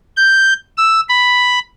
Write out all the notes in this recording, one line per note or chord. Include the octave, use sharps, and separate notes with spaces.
G6
E6
B5